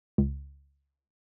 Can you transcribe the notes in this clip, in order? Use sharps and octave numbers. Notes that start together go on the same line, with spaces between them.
C#2